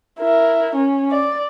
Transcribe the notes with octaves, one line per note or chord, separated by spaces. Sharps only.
E4 A#4
C#4
D5